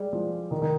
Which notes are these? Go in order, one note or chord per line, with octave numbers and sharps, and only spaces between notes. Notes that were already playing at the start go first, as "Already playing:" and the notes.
Already playing: G3 G#3
F3
D#3
D#3